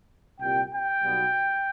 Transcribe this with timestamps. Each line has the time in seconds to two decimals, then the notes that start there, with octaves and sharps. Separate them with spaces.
0.40 C2 A#2 G3 G5
0.71 G5
1.02 B1 B2 G3 B3